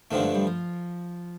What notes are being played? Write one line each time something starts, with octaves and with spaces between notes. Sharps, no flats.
G2 D3 D#3 F3 A3
G#3
G3
F3